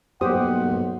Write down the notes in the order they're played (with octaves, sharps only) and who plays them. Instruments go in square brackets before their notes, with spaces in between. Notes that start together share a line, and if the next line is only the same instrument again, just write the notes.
[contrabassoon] B1 [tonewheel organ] G2 A#3 [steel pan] G4 C5 D#6 [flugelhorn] F#5